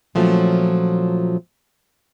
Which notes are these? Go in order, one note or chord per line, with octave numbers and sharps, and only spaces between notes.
A#2 F3 F#3 A3 C#4